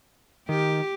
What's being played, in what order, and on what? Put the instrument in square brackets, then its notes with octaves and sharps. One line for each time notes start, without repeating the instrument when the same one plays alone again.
[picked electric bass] D#3 [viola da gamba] G4